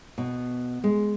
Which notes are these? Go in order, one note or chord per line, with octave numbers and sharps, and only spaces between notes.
B2
G#3